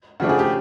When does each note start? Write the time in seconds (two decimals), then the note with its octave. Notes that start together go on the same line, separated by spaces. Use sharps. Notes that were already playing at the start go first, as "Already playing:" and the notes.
0.20 C#3 F3 A3 D4 F#4
0.29 G#4
0.39 G4